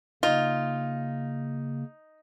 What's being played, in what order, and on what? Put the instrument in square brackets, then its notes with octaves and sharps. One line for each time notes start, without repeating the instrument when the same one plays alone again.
[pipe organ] C#3 A#3 [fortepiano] D#4 [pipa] F4